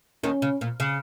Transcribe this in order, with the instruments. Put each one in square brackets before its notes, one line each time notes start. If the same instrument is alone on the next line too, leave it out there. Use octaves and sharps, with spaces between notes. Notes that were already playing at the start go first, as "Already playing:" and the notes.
[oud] D#2 D#3 [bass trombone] C#4
[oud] C#3
A#2
C#3